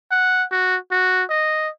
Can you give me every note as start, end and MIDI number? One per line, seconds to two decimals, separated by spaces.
0.11 0.44 78
0.52 0.77 66
0.91 1.24 66
1.30 1.69 75